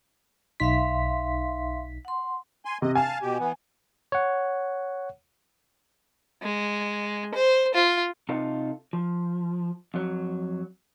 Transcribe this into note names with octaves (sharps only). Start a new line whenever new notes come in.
B1 D#4 E5 F5 C6 B6
F#5 C6
G#5 C6
C3 D#5
F5 G#5 A5
B2 G4
E3 B3
C#5 F#5
G#3
C5
F4
C3 D#4 F4 A4
F3
F2 F#3